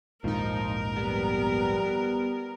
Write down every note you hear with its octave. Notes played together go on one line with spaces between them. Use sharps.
A#1 D#2 G#2 F3 D#4 A#4
G3 B3